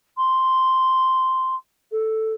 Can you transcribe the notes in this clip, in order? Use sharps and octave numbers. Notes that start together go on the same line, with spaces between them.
C6
A4